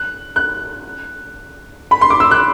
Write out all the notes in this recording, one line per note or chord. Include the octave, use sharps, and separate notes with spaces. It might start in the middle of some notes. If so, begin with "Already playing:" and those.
Already playing: F#6
F#6
B5
C6
D6
E6
F#6